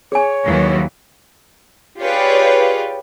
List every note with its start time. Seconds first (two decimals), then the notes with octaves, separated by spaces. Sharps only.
0.12 G#4 C#5 G#5
0.44 D#2 E3 F#3
1.98 F4 G4 G#4 B4 C#5 D5